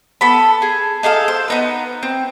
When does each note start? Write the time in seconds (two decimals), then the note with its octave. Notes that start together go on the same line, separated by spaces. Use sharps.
0.21 B3 A4 B5
0.62 G#4
1.03 D#4 G#4 A4 F5
1.28 C5
1.48 B3 D#4 B4
2.03 C4